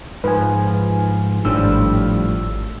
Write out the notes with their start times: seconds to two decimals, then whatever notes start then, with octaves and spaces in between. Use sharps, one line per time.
0.24 G#2 F3 B4 G#5
1.45 G#1 A2 F3 G3 D4 E6